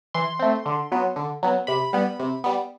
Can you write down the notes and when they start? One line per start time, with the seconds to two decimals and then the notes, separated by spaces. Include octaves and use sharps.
0.14 E3 C6
0.39 A3 C4
0.66 D3
0.92 F#3 B3
1.16 D3
1.43 F#3 B3
1.67 C3 B5
1.93 G3 B3
2.19 C3
2.44 G3 B3